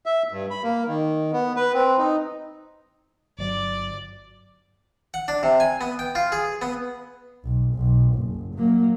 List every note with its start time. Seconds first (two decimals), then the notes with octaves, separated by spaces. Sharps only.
0.06 E5
0.32 G2
0.50 B5
0.63 A#3
0.88 D#3
1.33 B3
1.56 B4
1.74 C4
1.98 D#4
3.38 G1 F#3 D5
5.14 F#5
5.28 D4
5.43 C3
5.60 G#5
5.81 B3
5.99 G5
6.15 F4
6.32 G#4
6.62 B3
7.44 B1
7.75 B1
8.14 F#1
8.55 F#3 A#3